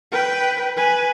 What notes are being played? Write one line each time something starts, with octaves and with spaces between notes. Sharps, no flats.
B4 G5
B4 G#5